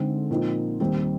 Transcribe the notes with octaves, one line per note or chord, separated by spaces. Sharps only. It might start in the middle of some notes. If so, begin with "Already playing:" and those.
Already playing: D3 G#3 C4 D#4
A#2 F3 C4 D#4
D#2 D#3 G3 C4 D#4